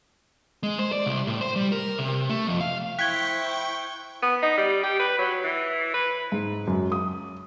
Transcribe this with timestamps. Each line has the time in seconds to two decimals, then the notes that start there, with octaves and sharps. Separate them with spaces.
0.63 G#3
0.79 C5
0.92 D5
1.06 C2
1.27 A2
1.41 C5
1.56 G3
1.72 A#4
1.99 C3
2.30 A3
2.48 F2
2.61 F5
2.99 E4 C5 G5 C#6 F#6 G#6 B6 G7
4.23 B3
4.42 D#4
4.57 G3
4.83 G4
4.99 B4
5.18 F#3
5.44 E3
5.94 B4
6.32 G#2
6.67 F#2
6.92 D#6